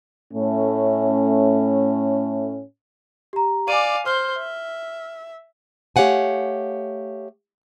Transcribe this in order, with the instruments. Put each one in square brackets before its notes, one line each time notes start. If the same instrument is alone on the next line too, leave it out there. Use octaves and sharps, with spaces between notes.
[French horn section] A2 A3 C#4
[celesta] G4 A#5
[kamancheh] D5 F5 [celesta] G#5 D6 D#7
[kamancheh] C5 [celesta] F6 G7
[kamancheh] E5
[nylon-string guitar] A3 G4 C#5 F5 F#5 G#5